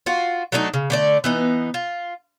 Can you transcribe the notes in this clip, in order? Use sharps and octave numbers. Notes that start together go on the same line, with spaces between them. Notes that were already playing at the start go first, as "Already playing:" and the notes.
F4 F#4
F#3 A3 D4 D#4
C#3
D3 A3 D5
E3 B3 D#4
F4